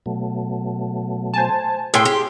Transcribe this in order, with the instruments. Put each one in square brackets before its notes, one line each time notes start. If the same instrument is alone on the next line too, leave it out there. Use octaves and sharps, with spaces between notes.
[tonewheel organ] B2 F#3 A3
[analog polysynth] C5 G#5 A5
[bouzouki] A2 G5 [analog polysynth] G#4 C6
[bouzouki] G4